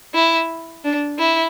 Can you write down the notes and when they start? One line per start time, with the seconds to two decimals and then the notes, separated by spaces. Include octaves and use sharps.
0.14 E4
0.84 D4
1.19 E4